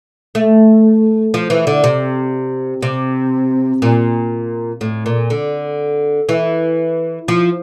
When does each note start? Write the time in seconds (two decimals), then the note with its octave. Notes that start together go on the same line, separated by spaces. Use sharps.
0.35 A3
1.34 F3
1.50 E3
1.67 D3
1.84 C3
2.82 C3
3.82 A#2
4.81 A2
5.06 A#2
5.30 D3
6.29 E3
7.28 F3